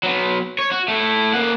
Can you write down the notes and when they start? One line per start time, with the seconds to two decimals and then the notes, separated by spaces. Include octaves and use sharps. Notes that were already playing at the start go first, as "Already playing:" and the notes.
0.03 F#3 B3
0.59 C#5
0.71 F#4
0.88 A3 E4
1.34 A#3 F#5